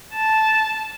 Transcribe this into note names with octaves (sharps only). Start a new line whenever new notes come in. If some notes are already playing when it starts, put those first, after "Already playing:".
A5